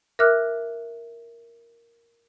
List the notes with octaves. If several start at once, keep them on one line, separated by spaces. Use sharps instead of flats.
A#4 E5 D6 F6 F#6